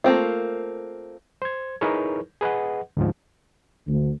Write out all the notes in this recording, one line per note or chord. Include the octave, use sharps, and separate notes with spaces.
A3 A#3 C4 F4
C5 G#6
D#4 E4 G#4 A#4 B4 C#5
G#4 B4 D#5 F#5
D2 G#2 F3
D2